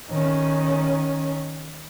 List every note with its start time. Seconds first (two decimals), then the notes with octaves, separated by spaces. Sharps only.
0.10 D#3 C#4